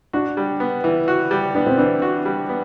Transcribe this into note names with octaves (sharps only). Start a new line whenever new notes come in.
D4 F#4
G3
B3
E3 E4
F#4
G3
B3 D4
C4
E3 D4
F#4
G3
B3